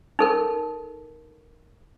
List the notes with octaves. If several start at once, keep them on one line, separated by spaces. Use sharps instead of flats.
D#4 A4 A#4